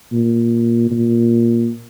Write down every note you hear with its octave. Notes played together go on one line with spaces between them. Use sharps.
A#2
A#2